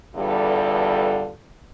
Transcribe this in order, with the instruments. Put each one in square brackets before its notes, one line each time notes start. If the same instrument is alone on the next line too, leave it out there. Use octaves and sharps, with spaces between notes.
[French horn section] E2 G2 D3 G3 F4 A4